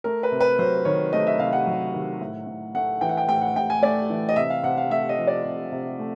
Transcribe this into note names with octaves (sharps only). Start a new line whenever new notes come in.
A3 A#4
B4
C3
B4
F#3 C5
D#3 C#5
A3 D#5
E5
C3 F5
F#5
F#3
D#3
A2
A2
A3 F#5
E3 G5
F#5
G5
A2 G5
F#5
A2 G5
G#5
A3 D5
E3
D#5
C3 E5
F5
C3 F#5
F5
A3 E5
D#5
F3
D5
C3
C3
A3